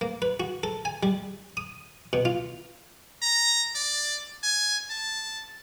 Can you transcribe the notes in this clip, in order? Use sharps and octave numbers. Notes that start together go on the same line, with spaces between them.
A#3
B4
F#4
A4
G#5
G3
D#6
B2
F4
A#5
D5
G#5
A5